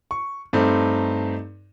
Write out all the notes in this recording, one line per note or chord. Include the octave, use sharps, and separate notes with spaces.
C#6
G2 A3 C4 D#4